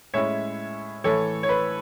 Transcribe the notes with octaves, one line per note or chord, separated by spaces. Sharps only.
A2 G#3 C#4 E4 C#5 E5
A2 E3 A3 A4 C#5
C#5
B4